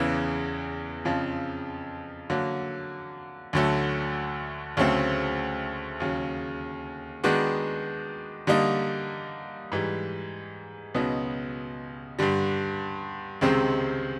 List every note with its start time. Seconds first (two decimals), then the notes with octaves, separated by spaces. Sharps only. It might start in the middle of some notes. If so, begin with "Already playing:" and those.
Already playing: E2 C#3 E3
1.05 F2 C#3 F3
2.30 D3 F#3 A#3
3.53 D2 D3 F#3 A3
4.77 D2 C#3 F#3 A3 C4
6.00 D#2 C#3 F#3
7.24 D#3 G#3 B3 D4 F#4
8.47 D3 G3 A#3 D#4
9.72 G#2 E3 G3
10.95 C#2 B2 F#3 B3 D#4
12.19 G2 D3 G3
13.41 C#2 C3 D#3 G#3 C4